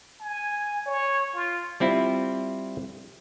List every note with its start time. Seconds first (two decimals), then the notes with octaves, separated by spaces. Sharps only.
0.20 G#5
0.86 C#5
1.34 F4
1.80 G3 C4 E4 F4